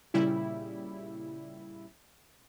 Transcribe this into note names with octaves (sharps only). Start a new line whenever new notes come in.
A#2 C#3 G3 E4